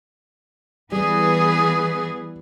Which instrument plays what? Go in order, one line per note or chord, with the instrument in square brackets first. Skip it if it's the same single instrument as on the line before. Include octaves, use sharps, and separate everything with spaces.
[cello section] E3 B3 B4 [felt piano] G3 [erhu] G#4